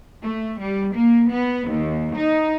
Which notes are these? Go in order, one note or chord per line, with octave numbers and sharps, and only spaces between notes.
A3
G3
A#3
B3
D#2
D#4